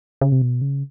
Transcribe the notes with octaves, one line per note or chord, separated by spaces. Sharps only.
C#3
C3
B2
C#3